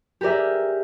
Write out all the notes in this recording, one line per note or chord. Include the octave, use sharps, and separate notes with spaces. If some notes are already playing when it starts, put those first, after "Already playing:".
G4 G#4 A#4 D5 E5